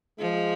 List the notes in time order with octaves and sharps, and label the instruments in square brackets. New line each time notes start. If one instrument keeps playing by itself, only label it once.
[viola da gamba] F3 [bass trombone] G#3